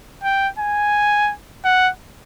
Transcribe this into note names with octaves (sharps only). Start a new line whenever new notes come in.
G5
G#5
F#5